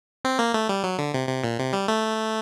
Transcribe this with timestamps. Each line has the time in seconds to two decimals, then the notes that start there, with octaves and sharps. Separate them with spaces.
0.25 C4
0.39 A#3
0.54 A3
0.69 G3
0.84 F#3
0.98 D3
1.14 C3
1.29 C3
1.44 A#2
1.59 C3
1.73 G3
1.88 A3